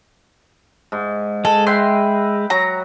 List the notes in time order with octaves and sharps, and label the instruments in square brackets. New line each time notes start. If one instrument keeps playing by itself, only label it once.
[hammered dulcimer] G#2
[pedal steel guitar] G#3 [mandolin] A4
[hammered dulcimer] B4 E5 G5 [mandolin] C6
[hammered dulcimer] F#3 [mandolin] A#5